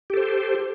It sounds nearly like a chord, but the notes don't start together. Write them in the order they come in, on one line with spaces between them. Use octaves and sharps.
G4 A4 C5